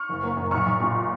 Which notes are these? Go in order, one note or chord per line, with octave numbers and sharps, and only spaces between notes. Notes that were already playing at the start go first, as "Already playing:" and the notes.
Already playing: C#6 F6
F#1
A#3
F#2
B1 C#6 F6
B1
A#2